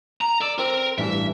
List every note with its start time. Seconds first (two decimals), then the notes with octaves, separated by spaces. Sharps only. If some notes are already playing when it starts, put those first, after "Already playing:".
0.21 A#5
0.42 D5 E6
0.59 C4 A#4
0.98 A1 G2 E3 E5